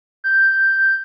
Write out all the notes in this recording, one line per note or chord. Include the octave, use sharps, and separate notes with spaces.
G6